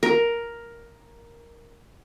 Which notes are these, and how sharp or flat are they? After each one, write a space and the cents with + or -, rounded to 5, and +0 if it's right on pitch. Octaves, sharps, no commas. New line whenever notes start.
A#4 +5